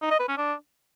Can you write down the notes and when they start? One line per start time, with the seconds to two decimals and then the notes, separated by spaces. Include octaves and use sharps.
0.02 D#4
0.10 D#5
0.19 B4
0.28 C#4
0.37 D4